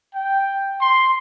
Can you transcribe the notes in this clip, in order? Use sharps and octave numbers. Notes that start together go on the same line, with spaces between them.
G5
C6